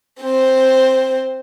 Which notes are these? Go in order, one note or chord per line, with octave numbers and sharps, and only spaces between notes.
C4 C5